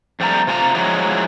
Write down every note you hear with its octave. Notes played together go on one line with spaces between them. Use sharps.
F2 G3 A3 A#5
C3 F4 G#5 A#5
F3 F#3 G#3 D#4 E4